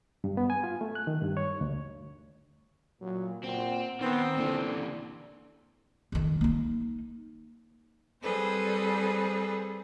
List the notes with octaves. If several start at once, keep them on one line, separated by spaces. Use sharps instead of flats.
G2
B3
G#5
F4
A3
F#6
D#3
G2
C#5
D2
A#2 F#3
A#2 C4 F#5
D#3 B3 C4
A#2 D3 E3 D5
F2 D#3
A#3 D#4
G3 C4 G#4 A4 B4 C5